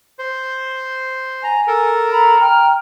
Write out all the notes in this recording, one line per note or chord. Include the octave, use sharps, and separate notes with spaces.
C5
G#5 A#5
A4 A#4
A#5 B5
G5 A#5 F6